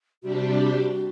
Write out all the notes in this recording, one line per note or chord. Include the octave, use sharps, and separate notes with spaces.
C3 G3 D4 F#4 G4